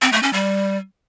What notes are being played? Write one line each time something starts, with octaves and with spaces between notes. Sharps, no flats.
C4
A3
C#4
G3